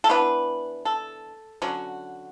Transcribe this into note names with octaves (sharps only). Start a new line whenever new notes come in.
A4
E3 B3 D4 B4
A4
D3 F#3 C#4 F#4